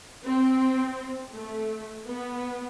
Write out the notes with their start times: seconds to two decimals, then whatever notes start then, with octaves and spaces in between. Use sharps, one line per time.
0.24 C4
1.33 A3
2.07 B3